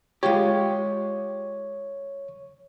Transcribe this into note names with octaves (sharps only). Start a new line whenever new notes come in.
G#3 F4 G4 C#5